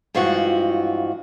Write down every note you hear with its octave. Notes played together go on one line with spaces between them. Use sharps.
G2 E3 F3 G#3 F4 F#4